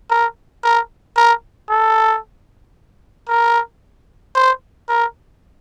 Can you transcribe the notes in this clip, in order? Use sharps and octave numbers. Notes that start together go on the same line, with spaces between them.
A#4
A#4
A#4
A4
A#4
C5
A#4